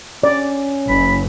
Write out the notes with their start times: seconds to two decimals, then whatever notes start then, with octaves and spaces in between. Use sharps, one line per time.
0.23 C#4 D5
0.89 F#1 B5